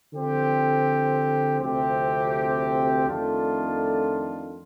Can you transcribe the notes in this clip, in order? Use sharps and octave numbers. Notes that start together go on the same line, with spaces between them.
D3 F3 C4 G4
D2 C3 F3 C4 G4
F2 D#3 A3 D4 F4